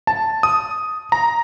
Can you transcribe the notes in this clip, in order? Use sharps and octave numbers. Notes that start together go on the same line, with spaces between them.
A5
D#6
A#5